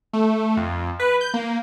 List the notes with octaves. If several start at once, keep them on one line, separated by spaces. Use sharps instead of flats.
A3
F2
B4
G6
A#3